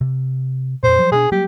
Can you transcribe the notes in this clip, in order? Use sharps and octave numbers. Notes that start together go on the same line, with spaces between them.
C3
F2 A#2 C5
F3 F#3
B2 G#3 D4 G#4
F#3 G3 A#3 G4